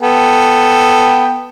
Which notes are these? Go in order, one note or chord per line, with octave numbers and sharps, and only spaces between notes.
B3 A4 G5